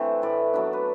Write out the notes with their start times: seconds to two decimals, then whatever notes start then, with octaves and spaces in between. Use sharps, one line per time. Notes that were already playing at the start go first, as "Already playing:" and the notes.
Already playing: E3 A3 C4 D4 G4
0.22 A2 B4 D5
0.54 F#3 B3 D4
0.73 B4